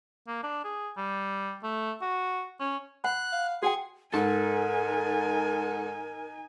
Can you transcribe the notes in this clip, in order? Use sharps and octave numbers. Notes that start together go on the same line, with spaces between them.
A#3
D4
G#4
G3
A3
F#4
C#4
F#5 B5 F#6
F5
F#4 G#4 F#5 G5 G#6
G#2 D#4 A4 A#4 G#5